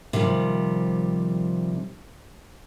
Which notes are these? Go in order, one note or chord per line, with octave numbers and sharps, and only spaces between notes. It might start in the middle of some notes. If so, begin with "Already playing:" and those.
C3 D#3 F3 G3